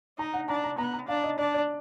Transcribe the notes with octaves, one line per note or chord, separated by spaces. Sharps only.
D#4 A#5
F#5
D4 A#5
A#5
B3 A#5
A#5
D4 F5
D#5
D4 D5
D5